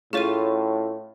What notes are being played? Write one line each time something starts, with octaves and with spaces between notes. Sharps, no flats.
A2 C#4 F4 G#4 C#5 D#7